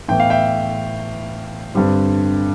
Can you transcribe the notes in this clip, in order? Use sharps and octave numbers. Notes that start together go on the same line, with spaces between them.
A2 E3 B3 G5
F5
E5 G5
G2 D3 G3 C4